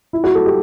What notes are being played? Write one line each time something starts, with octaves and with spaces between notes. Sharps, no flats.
E4
F#4
A4
G4